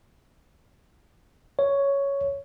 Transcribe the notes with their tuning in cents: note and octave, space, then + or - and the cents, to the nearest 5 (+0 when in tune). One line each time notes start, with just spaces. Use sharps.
C#5 +5